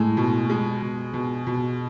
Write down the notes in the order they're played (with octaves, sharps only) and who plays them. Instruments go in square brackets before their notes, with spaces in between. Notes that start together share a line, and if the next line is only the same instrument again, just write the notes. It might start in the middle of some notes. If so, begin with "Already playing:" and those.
Already playing: [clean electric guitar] A2 [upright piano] G#3
[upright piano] B2
G#3
B2
B2
B2